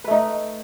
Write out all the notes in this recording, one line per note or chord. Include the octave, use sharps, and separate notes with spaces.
A3 D#4 B4